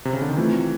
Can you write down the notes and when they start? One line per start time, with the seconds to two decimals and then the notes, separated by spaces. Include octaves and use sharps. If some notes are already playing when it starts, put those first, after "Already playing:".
0.05 C3
0.13 C#3
0.22 D3
0.29 D#3
0.37 E3 A3 C4 F4